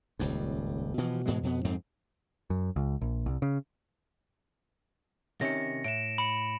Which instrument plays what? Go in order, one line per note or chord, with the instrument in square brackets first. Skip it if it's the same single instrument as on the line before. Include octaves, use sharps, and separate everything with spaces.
[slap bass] D#1 C#2 G2
B2 E3 F3
G#2 B2 E3 G#3
F2 B2 B3
F2 G#2 C4
[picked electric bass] F#2
C#2
A#1
C2
C#3
[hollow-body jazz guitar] C3 D#3 C#4 [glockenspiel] A#6 C#7
[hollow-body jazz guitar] A2 [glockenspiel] D7 E7
[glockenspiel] B5 C#7